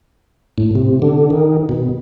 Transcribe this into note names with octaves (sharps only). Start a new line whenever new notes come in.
A2
C3
D3
D#3
B2